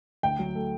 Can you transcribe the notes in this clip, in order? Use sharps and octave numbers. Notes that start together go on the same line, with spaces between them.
D2 G5
F#3
A3